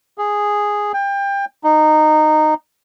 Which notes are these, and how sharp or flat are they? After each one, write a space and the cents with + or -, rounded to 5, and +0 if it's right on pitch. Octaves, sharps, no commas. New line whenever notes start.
G#4 -5
G5 +25
D#4 -15